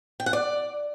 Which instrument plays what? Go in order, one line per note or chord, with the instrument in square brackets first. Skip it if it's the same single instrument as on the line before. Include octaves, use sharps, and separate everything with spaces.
[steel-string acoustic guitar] G5
F#5
D5